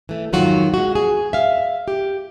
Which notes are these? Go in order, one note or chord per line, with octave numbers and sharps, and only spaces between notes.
E3 A3
F2 G#2 D#3 F#3 F4 F#4
G#3 F#4
G#4
E5 F5
G4